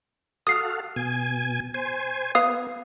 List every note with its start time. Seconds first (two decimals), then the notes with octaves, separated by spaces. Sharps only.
0.47 F#4 A4 F5 D#6 C7
0.96 B2 G#5
1.74 C5 G#5
2.35 B3 B4 F5 D#6